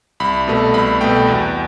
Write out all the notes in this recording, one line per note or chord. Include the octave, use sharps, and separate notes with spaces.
C2 B5
B2 A3
C2 B5
B2 A3 G5
E2